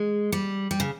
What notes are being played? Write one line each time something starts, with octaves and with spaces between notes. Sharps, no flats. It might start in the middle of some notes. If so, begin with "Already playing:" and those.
Already playing: G#3
G3
G3
C#3